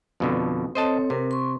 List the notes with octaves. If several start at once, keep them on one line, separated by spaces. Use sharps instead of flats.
F2 B2 D3
C4 A4 C5 C#5 D#5 A5
C3 A#4
C6 C#6